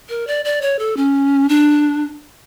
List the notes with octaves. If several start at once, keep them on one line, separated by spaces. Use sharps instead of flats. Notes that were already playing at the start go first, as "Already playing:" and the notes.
A#4
D5
D5
C#5
A4
C#4
D4